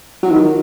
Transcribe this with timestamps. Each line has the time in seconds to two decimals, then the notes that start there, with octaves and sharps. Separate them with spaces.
0.23 F#3
0.31 D#3